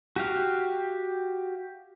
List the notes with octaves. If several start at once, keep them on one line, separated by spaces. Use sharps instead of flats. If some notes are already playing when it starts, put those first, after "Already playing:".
F#4 G4 F5